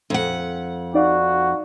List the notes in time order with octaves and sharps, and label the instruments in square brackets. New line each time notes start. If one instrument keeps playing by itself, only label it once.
[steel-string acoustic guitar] F2 F#5
[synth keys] D#4 D5 F5 [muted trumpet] F#4